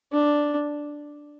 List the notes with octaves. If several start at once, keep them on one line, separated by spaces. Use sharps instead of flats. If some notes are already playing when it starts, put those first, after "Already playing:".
D4